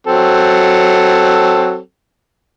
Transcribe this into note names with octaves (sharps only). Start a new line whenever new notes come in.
F#3 C4 A4